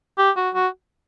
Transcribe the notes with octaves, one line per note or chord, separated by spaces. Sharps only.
G4
F#4
F#4